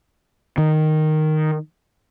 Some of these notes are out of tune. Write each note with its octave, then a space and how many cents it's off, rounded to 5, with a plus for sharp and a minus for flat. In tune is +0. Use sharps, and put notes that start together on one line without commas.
D#3 -5